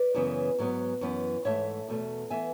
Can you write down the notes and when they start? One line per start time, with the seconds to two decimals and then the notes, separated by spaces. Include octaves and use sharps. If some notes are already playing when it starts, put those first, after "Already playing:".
Already playing: B4 D5
0.14 F#2 C#3 E3 B3
0.58 G#2 F#3 B3
1.01 F#2 E3 B3
1.45 G#2 E3 A3 C#5 E5
1.88 E2 B2 A3
2.30 E3 B3 E5 G#5